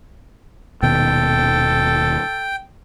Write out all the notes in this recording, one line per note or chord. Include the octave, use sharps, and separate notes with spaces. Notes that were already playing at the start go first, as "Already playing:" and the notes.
D#1 B2 D#3 A4 G5